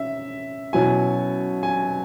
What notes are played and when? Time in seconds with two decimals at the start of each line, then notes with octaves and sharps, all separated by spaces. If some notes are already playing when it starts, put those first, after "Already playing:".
Already playing: C#4 E5
0.73 B2 F#3 C#4 E4 G#5
1.63 G#5